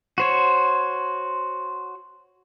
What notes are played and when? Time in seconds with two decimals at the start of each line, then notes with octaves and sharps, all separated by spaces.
0.18 F#4 C5 C#5